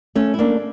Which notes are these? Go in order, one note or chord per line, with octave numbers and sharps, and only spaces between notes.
A3 C#4
E4
A#3 D4